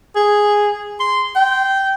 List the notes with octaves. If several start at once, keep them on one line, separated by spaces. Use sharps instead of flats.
G#4
C6
G5